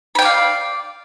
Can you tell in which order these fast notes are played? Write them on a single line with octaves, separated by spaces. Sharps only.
B5 G5 D5 F5